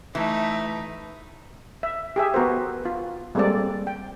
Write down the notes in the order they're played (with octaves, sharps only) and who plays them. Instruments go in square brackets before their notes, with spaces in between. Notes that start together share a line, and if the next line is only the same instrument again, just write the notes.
[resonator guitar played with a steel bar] E3 [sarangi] A3 [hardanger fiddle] D#4 [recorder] E5
[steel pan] E5
G4 G#4 E5
B3 F#4 A#4 C5
F4
G3 G#3 A#3 C4 A4 D5
G5